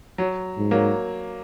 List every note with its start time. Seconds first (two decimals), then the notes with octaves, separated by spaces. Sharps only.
0.18 F#3
0.58 G#2
0.71 F#3 A#3